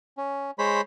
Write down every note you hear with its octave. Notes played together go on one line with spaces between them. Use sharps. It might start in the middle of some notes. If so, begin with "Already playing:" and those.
C#4
G#3 C5 C#5 B5